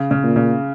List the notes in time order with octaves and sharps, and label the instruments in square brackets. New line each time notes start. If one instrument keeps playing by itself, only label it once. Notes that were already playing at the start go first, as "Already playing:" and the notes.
Already playing: [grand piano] C#3
C#3
[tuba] A#2
[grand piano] C#3